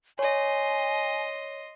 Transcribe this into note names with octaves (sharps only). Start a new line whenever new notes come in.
C#5 D#5 G#5 C6